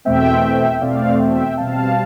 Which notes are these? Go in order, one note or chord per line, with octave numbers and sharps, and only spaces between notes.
E2 B2 A3 C4 E5 G5
G5
E2 B2 A3 C4 D5 F5
E5 G5
B2 G3 C4 F5 A5